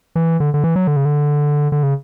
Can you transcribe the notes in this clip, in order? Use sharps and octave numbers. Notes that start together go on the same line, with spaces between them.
E3
D3
D3
E3
F#3
D3
C#3
D3
D3
C#3